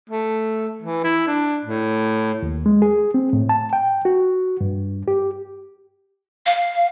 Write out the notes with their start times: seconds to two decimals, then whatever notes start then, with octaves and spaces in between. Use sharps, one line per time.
0.10 A3
0.83 E3
1.04 E4
1.27 D4
1.65 A2
2.43 D#2
2.66 G#3
2.82 G#4
3.14 C4
3.33 A2
3.49 A5
3.73 G5
4.05 F#4
4.61 G2
5.08 G4
6.46 F5